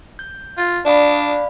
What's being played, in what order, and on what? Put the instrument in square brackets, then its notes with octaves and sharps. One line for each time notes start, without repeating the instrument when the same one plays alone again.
[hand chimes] G6
[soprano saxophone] F4
[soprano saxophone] D4 [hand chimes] D5 F5 B5